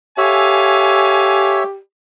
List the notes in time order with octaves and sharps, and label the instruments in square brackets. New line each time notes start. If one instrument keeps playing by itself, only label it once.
[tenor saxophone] G4 [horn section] A4 F5 G#5 [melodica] C#5 E5